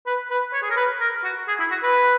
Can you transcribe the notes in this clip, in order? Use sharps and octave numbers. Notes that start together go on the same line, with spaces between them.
B4
B4
C#5
G#4
A#4
B4
A#4
F#4
G#4
E4
F#4
B4